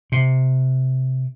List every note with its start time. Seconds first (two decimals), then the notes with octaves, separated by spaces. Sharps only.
0.12 C3